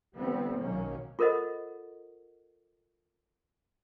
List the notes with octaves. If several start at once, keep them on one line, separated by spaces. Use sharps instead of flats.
D3 E3 G3 A3 B3 C4
B1 B2 D#3 F#3 A#3 C#4
F4 A4 A#4 C5 D#5 F#5